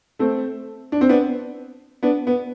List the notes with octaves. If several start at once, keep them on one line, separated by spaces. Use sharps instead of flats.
A3 C4
D4
C4
B3 D4
B3 D4
B3